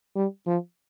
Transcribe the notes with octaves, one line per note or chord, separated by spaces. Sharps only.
G3
F3